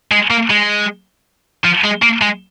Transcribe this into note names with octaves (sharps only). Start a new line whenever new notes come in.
G#3
A#3
G#3
F3
G#3
A#3
G#3